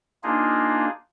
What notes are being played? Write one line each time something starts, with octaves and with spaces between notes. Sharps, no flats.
A#3 D4 D#4 F4 G#4